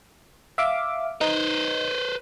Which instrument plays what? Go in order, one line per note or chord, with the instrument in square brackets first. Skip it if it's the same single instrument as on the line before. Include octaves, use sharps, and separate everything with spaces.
[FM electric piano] E5 F5 D6
[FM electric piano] D#4 [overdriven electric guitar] B4 C5